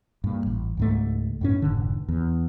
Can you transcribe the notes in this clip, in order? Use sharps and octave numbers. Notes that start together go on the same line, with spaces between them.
G2 A#2
A1
C#2 G#2 A3
F#2 A2 C#4
F1 G#2 D3
E2